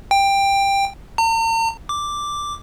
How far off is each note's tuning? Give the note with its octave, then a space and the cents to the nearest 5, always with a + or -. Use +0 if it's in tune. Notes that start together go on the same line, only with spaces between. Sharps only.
G5 +15
A#5 -45
D6 +0